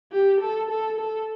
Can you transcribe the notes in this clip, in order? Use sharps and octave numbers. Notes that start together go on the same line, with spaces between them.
G4
A4
A4
A4